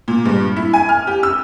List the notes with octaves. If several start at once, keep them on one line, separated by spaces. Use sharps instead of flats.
A#2
G2
E4
G#5
F6
G4
E6